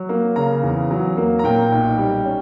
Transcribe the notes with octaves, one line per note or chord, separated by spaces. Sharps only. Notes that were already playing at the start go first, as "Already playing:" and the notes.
Already playing: F#3
A#3
C#3 A#5
E2
F#3
A#3
A#5
A#2 G5
B1
G3
C#4